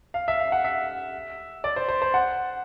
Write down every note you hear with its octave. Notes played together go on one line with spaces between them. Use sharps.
F5
E5
F5
F#5
E5
D5
C5
C5
C5
F#5